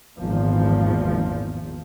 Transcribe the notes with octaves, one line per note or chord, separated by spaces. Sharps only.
G#1 E2 A#2 F3